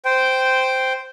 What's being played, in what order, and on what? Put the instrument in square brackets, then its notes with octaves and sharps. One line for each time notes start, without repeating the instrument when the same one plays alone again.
[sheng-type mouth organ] C5 G5